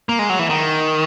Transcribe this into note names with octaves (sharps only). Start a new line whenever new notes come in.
A#3
G#3
F#3
E3
D#3